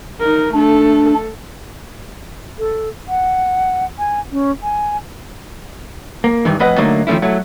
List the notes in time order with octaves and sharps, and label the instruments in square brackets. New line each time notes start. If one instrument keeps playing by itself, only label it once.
[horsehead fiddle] D#4 A#4
[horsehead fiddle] A3 A4 [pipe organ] D4
[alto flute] A4
F#5
G#5
C#4
G#5
[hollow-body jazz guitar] A#3
G2 D#3 E3
F2 A2 B4 D#5 F#5
D3 F#3 A3 A#3 D#4
D#3 F3 G#3 A3 C#4 E4
F#3 A3 E4